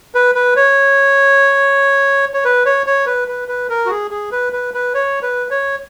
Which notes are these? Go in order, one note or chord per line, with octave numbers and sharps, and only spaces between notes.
B4
B4
C#5
C#5
B4
C#5
C#5
B4
B4
B4
A#4
F#4
G#4
G#4
B4
B4
B4
C#5
B4
C#5